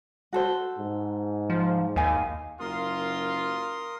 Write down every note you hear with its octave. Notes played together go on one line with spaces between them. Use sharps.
F#4 A4 C5
G#2
F3
D#2 D#4 F5 G#5
F#1 F4 A#4 C6 D#6